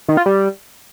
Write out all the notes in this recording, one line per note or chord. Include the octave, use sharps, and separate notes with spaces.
D#3
F4
G3